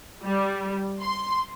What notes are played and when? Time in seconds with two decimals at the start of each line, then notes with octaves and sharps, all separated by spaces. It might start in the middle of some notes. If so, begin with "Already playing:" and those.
0.24 G3
1.01 C6